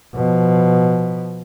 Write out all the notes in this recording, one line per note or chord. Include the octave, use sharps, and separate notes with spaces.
B2 F3